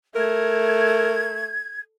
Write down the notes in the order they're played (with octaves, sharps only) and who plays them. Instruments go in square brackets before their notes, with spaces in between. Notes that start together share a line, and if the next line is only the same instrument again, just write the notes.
[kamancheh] A3 [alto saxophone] A#4 [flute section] G#6